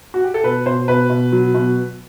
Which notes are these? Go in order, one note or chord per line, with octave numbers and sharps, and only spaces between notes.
F#4
G4
A4
B2 B4
B2 C5
B2 B4
B2
F#3
B2